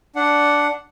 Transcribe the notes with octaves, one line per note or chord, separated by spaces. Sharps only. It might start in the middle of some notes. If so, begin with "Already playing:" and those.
D4 F#5